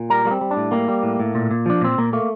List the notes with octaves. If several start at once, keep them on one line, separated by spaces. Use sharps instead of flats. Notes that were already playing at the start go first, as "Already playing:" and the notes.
Already playing: A#2
G3 A#4
G3 A#3
C4
G3
D4
A2
G3 A#3
G3
A2
A2
A#2
A#2
F3 D4
A#2 C4
A#2 A#3
A3 A#3